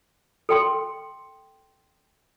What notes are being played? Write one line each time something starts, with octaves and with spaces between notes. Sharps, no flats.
A4 G5 C6